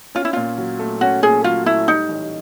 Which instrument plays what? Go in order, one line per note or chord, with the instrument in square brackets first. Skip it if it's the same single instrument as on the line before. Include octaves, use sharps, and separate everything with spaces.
[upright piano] C#4 [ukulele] F4
[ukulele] E4
[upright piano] A#2 [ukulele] F4
[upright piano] F#3
A3
[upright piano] C#4 [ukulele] F#4
[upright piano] A#2 [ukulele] G#4
[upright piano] F#3 [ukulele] F4
[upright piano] A3 [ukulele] E4
[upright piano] G3 [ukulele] D#4
[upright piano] A1